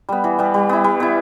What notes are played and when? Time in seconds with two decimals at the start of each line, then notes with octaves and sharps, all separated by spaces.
0.09 G3 B3
0.24 E3
0.39 G3 B3
0.54 G3
0.69 B3 E4
0.84 G3
1.00 B3 E4